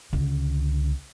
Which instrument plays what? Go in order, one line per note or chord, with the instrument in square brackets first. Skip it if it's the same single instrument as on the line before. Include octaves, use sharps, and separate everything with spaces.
[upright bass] C#2 D3